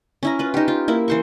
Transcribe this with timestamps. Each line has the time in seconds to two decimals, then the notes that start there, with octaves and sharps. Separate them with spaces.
0.23 C#4 E4 A#5
0.39 F4 B4
0.54 D#4 G4
0.68 F4
0.88 A#3 E4
1.08 E3 C5 C#6